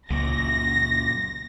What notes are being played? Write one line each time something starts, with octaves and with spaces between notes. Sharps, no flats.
C#2 F#2 A#2 A#6